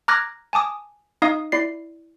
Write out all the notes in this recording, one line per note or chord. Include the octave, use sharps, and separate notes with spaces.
A#5 D6 F6 F#6 G#6 A#6
G#5 A5 D6 D#6
D#4 D#5 F5 D#6
E4 D5 C7